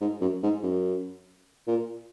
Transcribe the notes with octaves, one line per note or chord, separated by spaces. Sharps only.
G#2
F#2
G#2
F#2
A#2